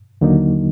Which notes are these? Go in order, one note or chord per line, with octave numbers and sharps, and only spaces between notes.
D#2 D3 F#3 A#3 D#4